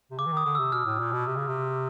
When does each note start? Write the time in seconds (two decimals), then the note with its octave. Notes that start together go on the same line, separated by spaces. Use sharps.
0.11 C3
0.19 C#3 D6
0.26 E3
0.32 D#3 D#6
0.46 D3 D#6
0.55 C3 E6
0.72 B2 F6
0.86 A2
1.00 A#2
1.12 B2
1.27 C3
1.37 C#3
1.48 C3